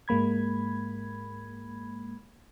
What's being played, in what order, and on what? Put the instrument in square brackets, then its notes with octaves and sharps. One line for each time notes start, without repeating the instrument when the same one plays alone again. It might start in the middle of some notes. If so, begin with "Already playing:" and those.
[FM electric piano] G#2 G#3 A#3 B5 G#6